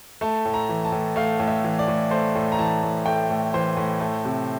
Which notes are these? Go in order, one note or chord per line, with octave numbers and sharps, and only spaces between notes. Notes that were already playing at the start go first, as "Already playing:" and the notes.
A3 A5
A2
A#5
E3
A5
A2
A3 F5
A2
E5
E3
D5
A2
A3 C5
A2
A#5
E3 A5
A2
A3 G5
A2
E3 C5
A2
A3
C3